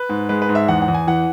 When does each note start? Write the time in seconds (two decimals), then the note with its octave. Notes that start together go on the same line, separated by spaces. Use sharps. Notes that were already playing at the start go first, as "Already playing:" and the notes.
Already playing: B4
0.09 G#2
0.29 G#3 B4
0.42 B4
0.49 G#2
0.55 E5
0.68 E2 F#5
0.82 F#5
0.88 E2
0.94 G#5
1.07 E3 F#5